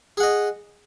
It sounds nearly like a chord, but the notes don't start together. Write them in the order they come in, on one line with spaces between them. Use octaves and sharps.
G#4 F#5 D#5